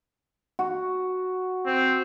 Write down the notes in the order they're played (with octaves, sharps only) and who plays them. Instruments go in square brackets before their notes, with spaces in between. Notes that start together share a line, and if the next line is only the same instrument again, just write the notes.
[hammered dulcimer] F#4
[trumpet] C4